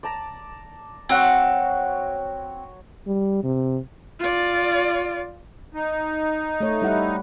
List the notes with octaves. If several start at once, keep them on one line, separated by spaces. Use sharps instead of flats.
D5 A5 A#5
F#3 C4 C#5 F#5
G3
C3
F4 D5
D#4
A3 C#5
G3 E4 F#5